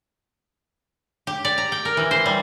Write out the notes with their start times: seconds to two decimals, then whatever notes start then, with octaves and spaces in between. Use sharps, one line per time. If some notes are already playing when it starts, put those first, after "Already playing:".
1.27 G4
1.45 D5
1.58 A#5
1.72 G5
1.85 A#4
1.97 E3
2.11 C5
2.26 G3